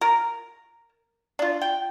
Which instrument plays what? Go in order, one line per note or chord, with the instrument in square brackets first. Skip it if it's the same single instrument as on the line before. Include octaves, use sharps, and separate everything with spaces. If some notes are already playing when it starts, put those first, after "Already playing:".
[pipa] A#4
D4 F4
G5